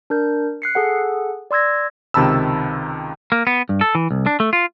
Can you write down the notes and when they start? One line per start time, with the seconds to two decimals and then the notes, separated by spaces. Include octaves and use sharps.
0.10 D4 A#4 G6
0.62 F#6 C7 C#7
0.75 G#4 A4 F#5
1.51 D5 C6 E6 G#6 A#6
2.14 C#2 C3 D#3 A5 B5 E6
3.32 A#3
3.47 B3
3.69 G2
3.81 A4
3.95 E3
4.11 C2
4.26 D4
4.40 A3
4.53 F4